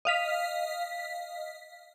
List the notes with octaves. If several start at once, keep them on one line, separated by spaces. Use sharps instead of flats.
D#5 F5 B6